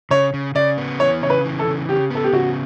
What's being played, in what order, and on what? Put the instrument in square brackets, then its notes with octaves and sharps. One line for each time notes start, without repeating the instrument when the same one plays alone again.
[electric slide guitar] C#3 [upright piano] C#5
[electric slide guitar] C#3
[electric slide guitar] C#3 [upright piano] D5
[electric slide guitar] B3
[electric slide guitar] E3 [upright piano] C#5
[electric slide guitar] C#3 [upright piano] C#5
[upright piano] B4
[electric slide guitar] E3
[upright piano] A4
[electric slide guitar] C#3
[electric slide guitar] C#3 [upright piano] G4
[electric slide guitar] B3 [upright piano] A4
[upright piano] G4
[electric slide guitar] C#3 [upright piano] F#4